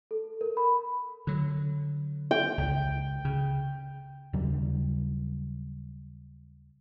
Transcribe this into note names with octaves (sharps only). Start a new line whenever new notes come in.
A4
A#4
B5
D3 F#3
G5
C#2
C#3
D#2 C#3 F#3 G3